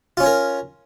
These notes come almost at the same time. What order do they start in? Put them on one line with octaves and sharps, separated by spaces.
F4 C#4 C#5 A#4